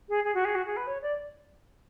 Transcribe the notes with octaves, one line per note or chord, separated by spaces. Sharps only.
G#4
G#4
F#4
G#4
F#4
G#4
B4
C#5
D5